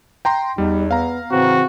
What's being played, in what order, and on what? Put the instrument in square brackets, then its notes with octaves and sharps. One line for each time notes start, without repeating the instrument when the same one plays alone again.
[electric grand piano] G5 A#5 C6
[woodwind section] E2 [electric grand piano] G3 [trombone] D#4
[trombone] B3 [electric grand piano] F5 A#5
[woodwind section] A2 C#3 E3 [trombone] C4 [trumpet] F#4